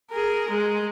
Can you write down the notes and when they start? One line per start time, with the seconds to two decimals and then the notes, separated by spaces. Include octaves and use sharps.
0.11 G#4 A#4
0.50 G#3